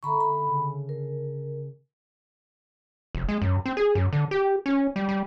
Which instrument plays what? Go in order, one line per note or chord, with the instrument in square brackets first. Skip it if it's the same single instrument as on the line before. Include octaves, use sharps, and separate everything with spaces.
[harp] D3 A3 C#4 [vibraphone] A#5 B5 C#6
[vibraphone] B5
[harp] C#3
[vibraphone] A#4
[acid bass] F1
G#3
F#2
C4
G#4
F#2
D3
G4
C#4
G3
G3